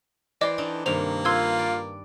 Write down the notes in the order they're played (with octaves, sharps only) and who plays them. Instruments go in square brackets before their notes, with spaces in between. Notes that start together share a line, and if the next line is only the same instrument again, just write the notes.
[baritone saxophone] E3 [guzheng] C5 G5 C6 [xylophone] D5 D#5 D6
[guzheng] D4 D#4 A4
[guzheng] G2 C3 D#3 [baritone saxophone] A#3 [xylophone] C5 F7
[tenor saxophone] F4 [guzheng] B4 [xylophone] C6 E6 G#6
[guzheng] D5